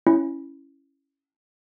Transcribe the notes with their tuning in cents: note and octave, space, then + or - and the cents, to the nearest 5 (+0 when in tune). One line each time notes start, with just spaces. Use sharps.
C#4 +0 E4 +0